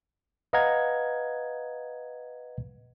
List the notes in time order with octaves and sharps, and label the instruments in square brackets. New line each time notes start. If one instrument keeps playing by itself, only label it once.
[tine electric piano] B4 D#5 F5 F#5 A#5 G#6